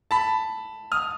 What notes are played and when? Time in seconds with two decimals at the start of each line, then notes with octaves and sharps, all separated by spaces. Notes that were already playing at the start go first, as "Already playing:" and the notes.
0.11 A5 B5
0.92 D#6 F6